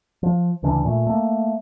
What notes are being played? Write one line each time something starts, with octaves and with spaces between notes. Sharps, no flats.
F3
D2 C#3 E3 D4
A#2 A3
A3 A#3